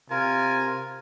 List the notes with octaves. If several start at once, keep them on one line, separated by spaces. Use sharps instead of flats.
C3 F4 A#4 G#5